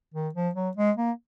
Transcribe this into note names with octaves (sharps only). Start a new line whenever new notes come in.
D#3
F3
F#3
G#3
A#3